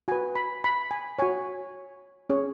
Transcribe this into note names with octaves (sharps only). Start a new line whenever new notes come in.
F#4 B4 G#5
B5
B5
G#5
F#4 C#5 G#5
C#4 G#4 C#5